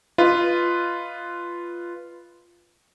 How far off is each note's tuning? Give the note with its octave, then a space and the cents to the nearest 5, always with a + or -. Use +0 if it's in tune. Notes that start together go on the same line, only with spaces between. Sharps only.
F4 -10 B4 +0 D#5 +0